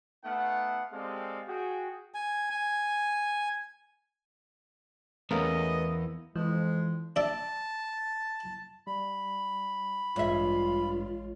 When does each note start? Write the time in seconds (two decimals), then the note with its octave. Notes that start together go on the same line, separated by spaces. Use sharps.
0.24 A3 B3 D#4 F5 F#5
0.92 G#3 C4 G4 A4 D5 F5
1.48 F#4 G#4 G5
2.14 G#5
2.50 G#5
5.31 E2 A3 B3 C#4 A#4 D#5 F5
6.36 F2 E3 G#3
7.16 D4 E5 A5
8.87 G3 B5
10.16 A1 G2 G#3 F4 C#5 E5